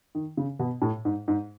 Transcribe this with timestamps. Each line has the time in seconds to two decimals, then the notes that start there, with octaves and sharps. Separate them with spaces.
0.15 D#3
0.37 C#3
0.59 B2
0.82 A2
1.05 G#2
1.28 G#2